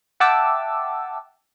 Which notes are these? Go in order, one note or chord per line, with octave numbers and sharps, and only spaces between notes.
E5 F#5 G5 A5 D6 E6